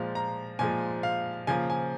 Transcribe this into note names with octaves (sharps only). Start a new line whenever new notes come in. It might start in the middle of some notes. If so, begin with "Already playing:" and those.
Already playing: A#2 F3 G#3 F5
A#5
A#2 F3 G#3 G#5
F5
C#3 F3 A#3 G#5
G#5